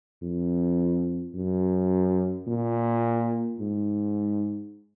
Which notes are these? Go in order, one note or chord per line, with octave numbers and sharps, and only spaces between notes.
F2
F#2
A#2
G#2